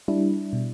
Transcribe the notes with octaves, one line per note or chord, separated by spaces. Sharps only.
G3 D4 E4
B2